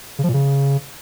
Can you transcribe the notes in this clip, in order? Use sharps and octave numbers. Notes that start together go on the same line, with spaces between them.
C#3
F3
A#2
C#3